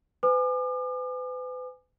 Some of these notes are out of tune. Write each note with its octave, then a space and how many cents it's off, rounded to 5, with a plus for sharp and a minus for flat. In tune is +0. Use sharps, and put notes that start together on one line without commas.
B4 +40 G#5 -5 D6 +45